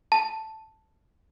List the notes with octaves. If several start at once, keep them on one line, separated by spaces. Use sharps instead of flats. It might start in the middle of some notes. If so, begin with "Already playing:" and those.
A5